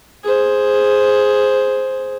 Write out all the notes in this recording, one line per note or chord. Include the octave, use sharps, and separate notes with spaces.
G#4 C5